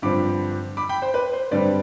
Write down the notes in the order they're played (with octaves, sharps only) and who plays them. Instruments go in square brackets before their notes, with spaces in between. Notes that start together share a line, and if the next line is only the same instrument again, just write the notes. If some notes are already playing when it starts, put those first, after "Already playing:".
[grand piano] G2 D3 F3 C4 B5 D6
B5 D6
G5 B5
C5
B4
C5
G2 D3 G3 C4 B4 D5